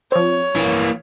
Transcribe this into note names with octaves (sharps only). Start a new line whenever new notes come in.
F3 C4 C#5
A#1 E3 A#3